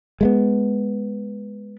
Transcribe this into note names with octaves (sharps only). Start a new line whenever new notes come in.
G#3 A3 B3